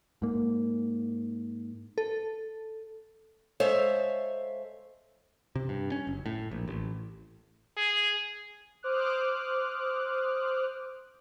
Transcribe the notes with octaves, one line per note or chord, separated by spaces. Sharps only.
G#2 A#3
A4
G#3 A4 C5 C#5 E5 F5
C3
G2
C#4
F#1
A2
A#1
A1
G#4
C5 D6 D#6 F6 F#6